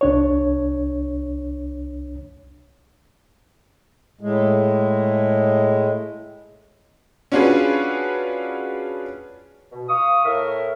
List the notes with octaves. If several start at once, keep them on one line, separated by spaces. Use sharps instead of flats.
C2 D4 C#5
A2 G#3
C#4 D4 F4 F#4 G#4 B4
B2
F5 C#6 D#6
A2 A#4 E5